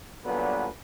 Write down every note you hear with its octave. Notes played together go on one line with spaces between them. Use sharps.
G2 A#2 D3 F#3 B3 B4